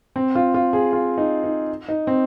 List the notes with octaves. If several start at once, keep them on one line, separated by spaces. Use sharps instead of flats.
C4
F4
F4
G#4
F4
D#4
D#4
D#4
C4